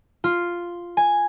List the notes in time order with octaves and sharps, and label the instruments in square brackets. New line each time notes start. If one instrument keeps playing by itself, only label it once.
[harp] F4
G#5